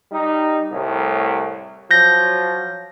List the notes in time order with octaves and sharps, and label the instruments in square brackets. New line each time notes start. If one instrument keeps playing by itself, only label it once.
[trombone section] G3 D#4
C2 A2
[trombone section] F3 F#3 [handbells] G6 A#6